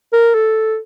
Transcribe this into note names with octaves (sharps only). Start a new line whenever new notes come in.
A#4
A4